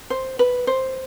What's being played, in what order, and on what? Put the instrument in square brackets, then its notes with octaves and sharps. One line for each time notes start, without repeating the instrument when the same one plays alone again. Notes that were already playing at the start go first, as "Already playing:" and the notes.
[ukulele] C5
B4
C5